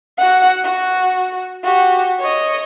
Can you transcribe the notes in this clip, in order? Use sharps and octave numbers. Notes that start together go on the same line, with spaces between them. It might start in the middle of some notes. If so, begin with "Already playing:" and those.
F#4 F#5
F#4
F#4 G4
C#5 D#5